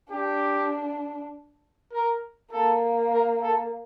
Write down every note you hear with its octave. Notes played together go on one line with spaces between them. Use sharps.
D4 G4
A#4
A#3 A4
A#4
A4